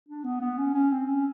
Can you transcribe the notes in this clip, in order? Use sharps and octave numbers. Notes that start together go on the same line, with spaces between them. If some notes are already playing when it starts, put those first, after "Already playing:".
D4
B3
B3
C#4
C#4
C4
C#4